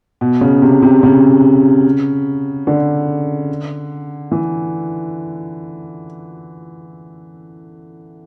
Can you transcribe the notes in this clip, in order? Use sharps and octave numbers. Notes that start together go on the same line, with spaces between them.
B2
C#3
C3
C3
C#3
D3
E3